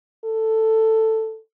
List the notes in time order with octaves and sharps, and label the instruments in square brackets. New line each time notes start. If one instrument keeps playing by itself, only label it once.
[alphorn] A4